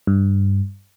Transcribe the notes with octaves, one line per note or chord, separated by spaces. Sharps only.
G2